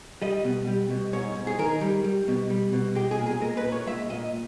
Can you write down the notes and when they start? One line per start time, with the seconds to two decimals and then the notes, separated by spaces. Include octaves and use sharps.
0.22 G3 D#5
0.44 B2
0.67 G3
0.90 B2
1.13 G#2 C#5
1.35 G#2
1.47 G#4
1.59 D#3 A#4
1.81 G3
2.04 G3
2.28 B2
2.50 G3
2.73 B2
2.95 G#3 G4
3.11 G#4
3.19 A#2
3.26 G#4
3.42 G#3 A#4
3.57 B4
3.65 A#2
3.72 C#5
3.87 G#3 E5
4.10 A#2 D#5